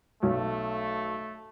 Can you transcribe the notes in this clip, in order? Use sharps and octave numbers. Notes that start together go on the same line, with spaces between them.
B1 A3